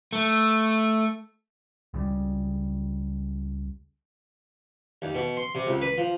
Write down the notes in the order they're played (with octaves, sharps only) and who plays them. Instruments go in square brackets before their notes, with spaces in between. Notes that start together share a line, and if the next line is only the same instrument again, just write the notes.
[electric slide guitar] A3
[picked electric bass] C#2 C#3 G3
[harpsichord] D#2
B2
C6
C3
C#2
B4
F3